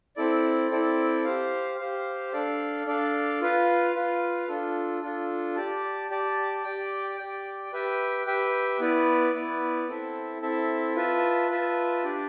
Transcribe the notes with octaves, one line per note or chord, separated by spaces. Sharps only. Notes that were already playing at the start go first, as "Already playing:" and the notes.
C4 E4 A4 D5
C4 E4 A4 D5
G4 C5 F5
G4 C5 F5
D4 A4 D5 F5
D4 A4 D5 F5
F4 B4 F5
F4 B4 F5
D4 F4 A4
D4 F4 A4
G4 D5 A5
G4 D5 A5
G4 D5 G5
G4 D5 G5
G4 B4 E5 G5
G4 B4 E5 G5
B3 E4 B4 D5
B3 E4 B4 D5
C4 E4 A4 E5 A5
C4 E4 A4 E5 A5
F4 B4 E5 A5
F4 B4 E5 A5
D4 G4 D5